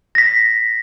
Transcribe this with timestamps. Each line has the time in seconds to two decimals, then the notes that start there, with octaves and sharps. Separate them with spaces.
0.15 A#6 B6